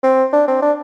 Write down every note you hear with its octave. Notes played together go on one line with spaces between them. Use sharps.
C4
D4
C4
D4